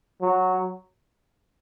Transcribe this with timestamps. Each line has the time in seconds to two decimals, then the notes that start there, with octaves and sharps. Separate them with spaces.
0.22 F#3